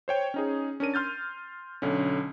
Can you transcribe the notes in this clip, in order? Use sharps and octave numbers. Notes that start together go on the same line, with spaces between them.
C5 C#5 G5
C#4 D#4 G#4
C#4 D4 A#4 D#7
C6 F6 G6 A6
B1 D3 C#4